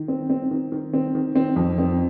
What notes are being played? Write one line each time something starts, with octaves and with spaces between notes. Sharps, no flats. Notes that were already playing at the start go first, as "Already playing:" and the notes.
Already playing: D#3
C4
C4
D#3
D#3
C4
D#3
C4
F2
C4